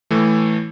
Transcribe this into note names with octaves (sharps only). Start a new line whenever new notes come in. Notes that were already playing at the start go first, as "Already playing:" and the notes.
A2 E3 A3